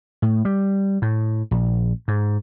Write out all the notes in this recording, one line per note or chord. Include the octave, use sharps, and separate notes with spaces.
A2
G3
A2
A#1
G#2